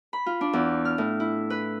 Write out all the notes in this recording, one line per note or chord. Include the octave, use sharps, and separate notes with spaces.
B5
F4
D4
E2
F6
A2
E4
B4